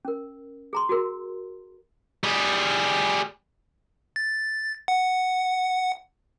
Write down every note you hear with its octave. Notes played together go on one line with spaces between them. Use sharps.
C#4 A#4
G#4 A#5 C6
F#4 G#4 A#4
G3 G#4
A6
F#5